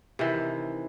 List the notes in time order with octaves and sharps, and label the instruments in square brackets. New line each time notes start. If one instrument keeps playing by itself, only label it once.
[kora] C3 D#3 E3